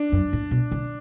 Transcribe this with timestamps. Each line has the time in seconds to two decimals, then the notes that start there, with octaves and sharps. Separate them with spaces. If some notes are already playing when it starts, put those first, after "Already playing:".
Already playing: D4
0.12 F#2
0.33 A2
0.51 B2
0.71 D3